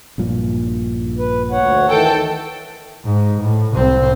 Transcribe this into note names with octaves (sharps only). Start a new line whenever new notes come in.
A#1 G2 A#2
B4
D2 C#5 F#5
D#3 E3 A4 G5
G#2
A2
C2 C4